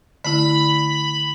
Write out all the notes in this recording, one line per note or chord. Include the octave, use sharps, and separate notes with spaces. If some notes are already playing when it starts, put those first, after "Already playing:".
D3 A3 E4 B5